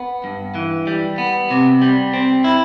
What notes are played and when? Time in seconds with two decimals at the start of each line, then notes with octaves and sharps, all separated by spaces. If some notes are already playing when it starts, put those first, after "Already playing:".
Already playing: B3
0.24 G2
0.55 E3
0.87 G3
1.18 B3
1.51 C3
1.82 G3
2.13 C4
2.44 E4